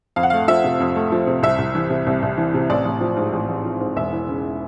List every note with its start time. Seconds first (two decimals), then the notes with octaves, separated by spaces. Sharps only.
0.16 F2 F5
0.23 F#5
0.30 A3 F5
0.48 F3 E5
0.64 C3
0.80 F2
0.96 A3
1.12 F3
1.27 C3
1.42 C2 E5
1.58 C2
1.75 E3
1.90 C3
2.07 C2
2.22 C2
2.37 E3
2.54 C3
2.70 A1 D5
2.85 A1
3.01 F3
3.17 G#2
3.33 A1
3.49 A1
3.65 F3
3.80 G#2
3.96 E1 E5
4.13 E3
4.28 C#3